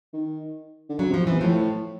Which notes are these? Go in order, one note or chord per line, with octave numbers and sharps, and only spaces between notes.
D#3
D3
C#3 F#3
C3
F3
C3
B2 E3
A2 F3